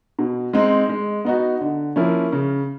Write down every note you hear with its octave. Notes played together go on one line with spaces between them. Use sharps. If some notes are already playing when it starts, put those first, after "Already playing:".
B2
G#3 C4 D#4
G#3
B3 D#4 F#4
D3
F3 A#3 C#4 E4
C#3